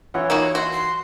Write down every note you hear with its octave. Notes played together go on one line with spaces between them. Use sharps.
E3 F4 C#5 F#5
A#3 D#4 F#4
F#4 C6
C6